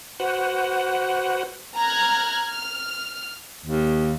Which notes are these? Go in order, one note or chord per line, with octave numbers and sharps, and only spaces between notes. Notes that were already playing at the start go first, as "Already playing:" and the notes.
F#4 B4 C5 F#5
A#5 F6 F#6 G#6
F6
D#2